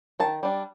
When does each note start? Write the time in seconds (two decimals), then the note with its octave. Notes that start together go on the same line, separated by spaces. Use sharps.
0.20 D#3 A5
0.43 G3 D4